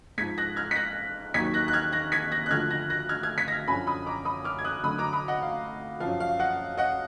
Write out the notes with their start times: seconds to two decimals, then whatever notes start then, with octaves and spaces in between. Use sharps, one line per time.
0.18 G#2 F3 G#6 B6
0.38 F#6 A#6
0.56 F6 G#6
0.71 B6
0.76 F#6 A#6
1.34 D#2 D#3 F#3 G#6 B6
1.54 F#6 A#6
1.68 F#6
1.73 F6 G#6
1.92 F#6 A#6
2.12 G#6 B6
2.32 F#6 A#6
2.46 F#6
2.51 D2 D3 F3 F6 G#6
2.71 F#6 A#6
2.90 F#6 A#6
3.09 F6 G#6
3.23 F6 G#6
3.38 G#6 B6
3.48 A#6
3.52 F6 G#6
3.68 F#2 D3 F3 G#5 B5
3.87 B5 D#6
4.06 A#5 D6
4.25 B5 D#6
4.44 D6 F6
4.59 G#6
4.64 D#6 F#6
4.83 D2 D3 F#3 B5 D#6
4.98 A#5 D6
5.13 B5 D#6
5.28 D#5 F#5
5.42 F5
6.00 F#2 F3 F5
6.20 F5
6.39 D#5 F#5
6.77 D#5 F#5